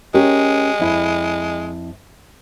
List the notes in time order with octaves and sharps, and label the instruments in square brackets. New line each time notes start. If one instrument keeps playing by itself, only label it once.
[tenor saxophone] G#3 [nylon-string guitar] C#4 G4 A#4
[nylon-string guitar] F2 E4